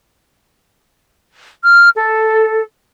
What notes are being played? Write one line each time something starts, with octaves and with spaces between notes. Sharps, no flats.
F6
A4